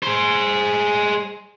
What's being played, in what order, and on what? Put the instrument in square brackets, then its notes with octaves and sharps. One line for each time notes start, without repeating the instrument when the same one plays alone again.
[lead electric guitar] G#4 C5